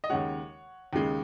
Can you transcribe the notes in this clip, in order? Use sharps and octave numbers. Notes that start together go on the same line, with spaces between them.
D#5
D#2 C#3 G#3 C#5 F#5
D#2 C#3 G#3